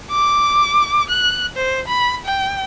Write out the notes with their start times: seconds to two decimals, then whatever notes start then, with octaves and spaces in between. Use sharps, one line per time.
0.11 D6
1.09 F#6
1.56 C5
1.87 B5
2.25 G5